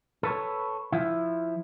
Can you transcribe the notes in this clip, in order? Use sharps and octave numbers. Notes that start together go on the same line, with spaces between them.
A4 B4 C#5
F3 E4